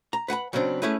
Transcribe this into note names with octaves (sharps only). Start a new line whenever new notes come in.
A#5
B4 F#5 G#5 B5
C#3 F#3 B3 C4 D4
A3 C#4 E4 G#4 B4